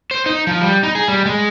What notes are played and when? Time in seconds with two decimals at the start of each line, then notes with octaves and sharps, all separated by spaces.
0.11 C5
0.26 D#4
0.47 F3
0.61 G3
0.83 D#4
0.95 G#4
1.08 G3
1.26 G#3